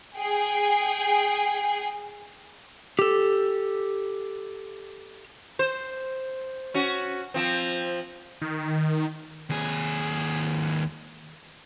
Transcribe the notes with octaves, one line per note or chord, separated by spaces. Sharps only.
G#4 G5 G#5 C7
G4 A4
C5
C#4 F#4
F3 C4
D#3
D#2 G#4